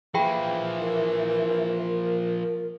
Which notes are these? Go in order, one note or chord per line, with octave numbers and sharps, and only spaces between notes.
E3 F3 A#3 G#4 G5 B5
A#4